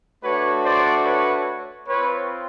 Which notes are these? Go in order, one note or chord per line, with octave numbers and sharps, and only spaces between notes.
A3 D4 F#4 B4 C#5
C5 D5
B4 C#5
C4 F4 B4 C#5